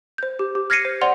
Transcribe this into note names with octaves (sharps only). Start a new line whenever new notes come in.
C5 G6
G4
G4
F6 G#6 A#6 C7 C#7 D#7
C5
C5 D5 F#5 C6 F7